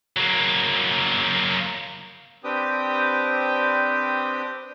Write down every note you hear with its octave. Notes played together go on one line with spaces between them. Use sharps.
F#3 A#3
C4 D4 G4 B4 G5 D#6